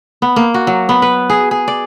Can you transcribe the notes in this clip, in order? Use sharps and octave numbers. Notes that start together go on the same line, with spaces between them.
B3
A#3
F#4
F#3
B3
B4
G#4
G#4
D5